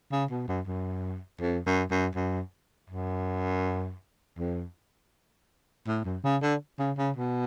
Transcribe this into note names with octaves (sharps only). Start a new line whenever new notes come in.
C#3
B2
F#2
F#2
F2
F#2
F#2
F#2
F#2
F2
A2
F#2
C#3
D3
C#3
C#3
B2